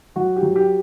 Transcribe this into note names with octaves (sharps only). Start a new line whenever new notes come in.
F#3 F#4
G4
F#3
G4